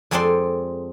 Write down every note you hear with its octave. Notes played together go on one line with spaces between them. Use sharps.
F2 G#3 C4 A4 D5 C6